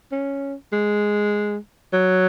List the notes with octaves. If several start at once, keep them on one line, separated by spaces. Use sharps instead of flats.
C#4
G#3
F#3